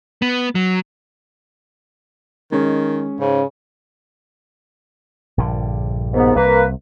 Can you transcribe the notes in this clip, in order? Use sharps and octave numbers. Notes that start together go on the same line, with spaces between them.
B3
F#3
D#3 G#3 C#4
G#2 C#3
A#1 G2 D3
D#2 G#2 B3
C2 A#3 B4